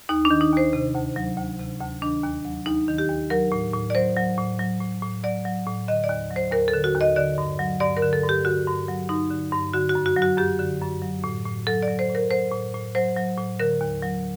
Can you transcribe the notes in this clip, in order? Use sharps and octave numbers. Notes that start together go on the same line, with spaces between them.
D#2 D#4
D4
D#3
D#4
D#2 C5
C3
D2
F#3
D2
C3
D2
D#3 D4
D#2
F#3
D#2 D#4
D#3
G4
D#2
F#3 A#4
A2
A2
D5
F#3 C5
F#3
A2
F#3
A2
A2
F#3 D5
F#3
A2
D3 D#5
D5
D#2
F#3
C5
D#2 A#4
A4
D3
F#4
D#2
D#5
D3 D5
G2
F#3
G2 D5
A#4
D3
A4
G2
G4
D3 F#4
G2
F#3
G2 D#4
D3
G2
D3 F#4
F#4
F#2
F#4
F#3
F#4
F#2 G4
D3
F#2
F#3
A2
A2
F#3 A4
D5
F#3
C5
A2
A#4
F#3 C5
A2
A2
F#3 C5
F#3
A2
D3 A#4
D#2
F#3